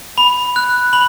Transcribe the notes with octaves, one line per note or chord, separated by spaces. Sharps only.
B5
F#6
B5 F#7